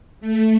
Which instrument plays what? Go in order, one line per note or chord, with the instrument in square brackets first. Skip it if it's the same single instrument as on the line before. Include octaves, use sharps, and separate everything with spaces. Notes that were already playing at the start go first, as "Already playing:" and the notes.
[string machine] A3